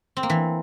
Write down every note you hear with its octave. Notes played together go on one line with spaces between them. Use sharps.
C4
A#3
E3